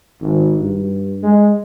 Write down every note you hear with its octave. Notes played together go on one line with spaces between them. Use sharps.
G#1
G2
G#3